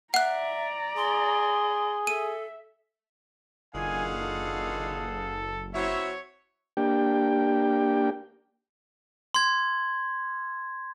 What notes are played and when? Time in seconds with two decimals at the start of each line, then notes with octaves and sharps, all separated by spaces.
0.14 D5 E5 F#5 A#5 F#6
0.97 G#4 C6
2.07 A4 E5 D#7
3.74 F#1 A#2 D3 D#3 G#4 F5 F#5 G#5
4.19 A4
5.74 F#3 C4 E4 C#5 E5
6.77 A#3 D4 G4 G5
9.34 C6 G#6